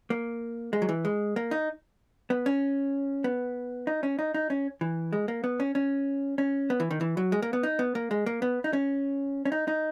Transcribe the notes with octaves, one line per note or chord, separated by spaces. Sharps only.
A#3
G#3
F#3
E3
G#3
A#3
D#4
B3
C#4
B3
D#4
C#4
D#4
D#4
C#4
E3
G#3
A#3
B3
C#4
C#4
C#4
B3
E3
D#3
E3
F#3
G#3
A#3
B3
D#4
B3
A#3
G#3
A#3
B3
D#4
C#4
C#4
D#4
D#4